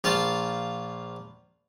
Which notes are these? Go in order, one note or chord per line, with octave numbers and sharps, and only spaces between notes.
A#1 F4 F5 A5